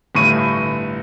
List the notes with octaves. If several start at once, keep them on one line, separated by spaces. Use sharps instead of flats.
G1 A2 C#6 D#7